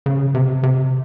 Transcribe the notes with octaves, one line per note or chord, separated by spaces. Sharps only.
C#3
C3
C3